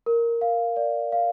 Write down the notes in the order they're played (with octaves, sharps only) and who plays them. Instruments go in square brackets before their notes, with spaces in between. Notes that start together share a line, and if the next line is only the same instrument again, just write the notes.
[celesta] A#4
F5
D5
F5